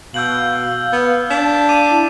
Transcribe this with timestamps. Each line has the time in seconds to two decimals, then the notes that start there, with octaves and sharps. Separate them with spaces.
0.14 B2 F5 E6 G6 F#7
0.93 B3
1.30 D4 B6 E7
1.69 D6 D#7
1.90 E4